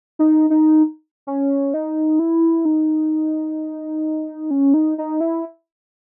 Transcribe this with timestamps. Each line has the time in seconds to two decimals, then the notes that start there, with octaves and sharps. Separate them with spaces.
0.19 D#4
0.50 D#4
1.27 C#4
1.74 D#4
2.19 E4
2.65 D#4
4.51 C#4
4.74 D#4
4.98 D#4
5.20 E4